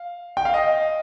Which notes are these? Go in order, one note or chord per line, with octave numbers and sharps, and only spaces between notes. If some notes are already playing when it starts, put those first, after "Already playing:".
Already playing: F5
G5
F5
D#5